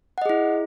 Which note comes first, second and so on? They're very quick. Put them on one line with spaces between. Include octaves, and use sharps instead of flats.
F#5 D#5 G#4 E4